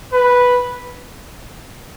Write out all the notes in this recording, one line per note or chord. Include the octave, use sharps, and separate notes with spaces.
B4